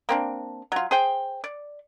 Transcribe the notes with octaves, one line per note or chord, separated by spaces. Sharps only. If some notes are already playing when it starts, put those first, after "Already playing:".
A#3 C4 D4
F#3 F4
G#4 C5 G5
D5